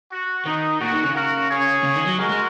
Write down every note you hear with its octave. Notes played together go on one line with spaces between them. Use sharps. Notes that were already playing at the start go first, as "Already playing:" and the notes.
F#4
D#3 D#4
A#2 F#4
D#3
C#3
F#4 A#4
G#4 C#5
C#3
D#3
F#3
G#3 F#4 A#4
G#3